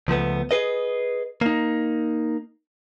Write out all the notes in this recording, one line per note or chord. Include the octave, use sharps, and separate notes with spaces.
C#2 F3 A3 B3
G#4 B4 D#5
A#3 D#4